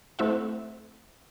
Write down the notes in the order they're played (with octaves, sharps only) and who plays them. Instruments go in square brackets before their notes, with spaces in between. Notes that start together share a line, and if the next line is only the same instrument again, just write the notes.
[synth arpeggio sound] A3 C4 E4 E5 F#5